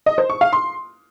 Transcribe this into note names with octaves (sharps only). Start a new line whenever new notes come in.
D#5
C5
C#6
F5
C6